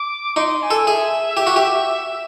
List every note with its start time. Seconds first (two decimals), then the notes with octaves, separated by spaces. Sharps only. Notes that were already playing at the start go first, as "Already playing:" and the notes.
Already playing: D6
0.36 D#4 C6
0.62 G#5
0.71 A4
0.87 G#4 E5
1.37 G4
1.47 F#4
1.56 G4